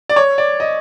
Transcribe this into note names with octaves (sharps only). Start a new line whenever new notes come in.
D5
C#5
D5
D#5